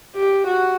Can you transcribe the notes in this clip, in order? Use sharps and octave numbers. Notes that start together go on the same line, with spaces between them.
G4
F#4